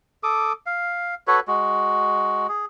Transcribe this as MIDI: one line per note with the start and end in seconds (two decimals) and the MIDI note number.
0.23 0.53 69
0.23 0.53 86
0.23 0.53 87
0.66 1.15 77
1.27 1.40 66
1.27 1.40 69
1.27 1.40 71
1.27 1.40 73
1.48 2.47 56
1.48 2.47 66
2.49 2.66 68